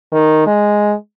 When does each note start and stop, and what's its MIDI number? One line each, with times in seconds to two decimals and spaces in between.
0.12 0.46 51
0.46 0.94 56